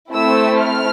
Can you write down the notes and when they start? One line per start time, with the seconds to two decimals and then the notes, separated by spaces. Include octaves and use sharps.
0.11 A3 C4 E4 E6
0.59 F6